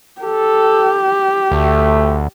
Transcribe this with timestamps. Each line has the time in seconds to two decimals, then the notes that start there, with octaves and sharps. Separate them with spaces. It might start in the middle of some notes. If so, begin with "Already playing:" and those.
0.21 G4 A4
1.51 D2 A3